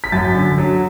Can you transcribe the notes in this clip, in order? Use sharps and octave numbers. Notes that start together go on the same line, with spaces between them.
B6
F#2 A6
D3
F#3